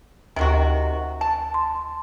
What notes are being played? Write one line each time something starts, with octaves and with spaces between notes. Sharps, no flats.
D2 C3 D#3 F#4
A5
C6